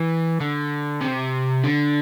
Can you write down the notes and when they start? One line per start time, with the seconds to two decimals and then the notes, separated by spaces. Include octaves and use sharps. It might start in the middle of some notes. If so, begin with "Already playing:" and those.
Already playing: E3
0.40 D3
1.01 C3
1.64 D3